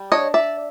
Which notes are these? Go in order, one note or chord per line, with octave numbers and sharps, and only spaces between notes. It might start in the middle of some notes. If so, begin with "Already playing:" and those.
Already playing: G3
D4 C#5 D#5
D5 E5